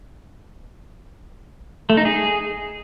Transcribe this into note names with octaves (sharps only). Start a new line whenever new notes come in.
A3
D#4
G#4